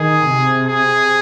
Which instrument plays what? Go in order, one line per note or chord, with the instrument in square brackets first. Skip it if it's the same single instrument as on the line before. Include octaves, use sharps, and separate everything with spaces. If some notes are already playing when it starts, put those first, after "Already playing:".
Already playing: [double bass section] D#3 [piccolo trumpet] G#4
[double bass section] C3
[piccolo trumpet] G#4